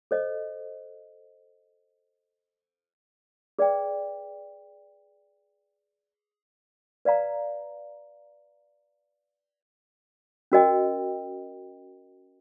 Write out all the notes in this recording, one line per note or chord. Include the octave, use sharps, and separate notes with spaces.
A4 C5 D#5
G#4 B4 D5 G5
B4 D5 F5 A#5
C#4 F#4 A#4 D#5 G5